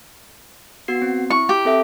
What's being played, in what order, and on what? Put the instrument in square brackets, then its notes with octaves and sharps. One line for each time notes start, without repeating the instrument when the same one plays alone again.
[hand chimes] B3 F#4 C7
C4
[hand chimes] E4 [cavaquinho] C#6
[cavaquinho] G4
[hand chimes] C4 A4 E5